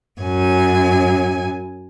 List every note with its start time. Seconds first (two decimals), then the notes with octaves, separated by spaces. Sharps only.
0.21 F#2 G#5